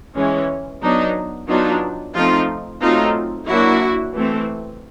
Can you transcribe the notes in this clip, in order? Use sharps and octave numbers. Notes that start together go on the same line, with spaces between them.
E3 G#3 C#4
F#3 B3 D4 D#4
F#3 B3 D4 D#4 F4
F3 A3 C4 D#4 F4
F#3 A3 C4 D#4 F4
F#3 A#3 D4 E4 F#4
E3 A3 C4